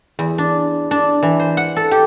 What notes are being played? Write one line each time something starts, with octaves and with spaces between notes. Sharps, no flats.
E2
D4
D4
E3
C5
F#5
A4
G4